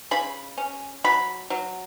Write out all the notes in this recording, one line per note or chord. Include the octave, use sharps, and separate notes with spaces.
C#3 B5
C#4
F#3 B5
F#3